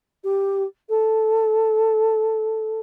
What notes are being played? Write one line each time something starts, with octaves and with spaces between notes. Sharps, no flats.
G4
A4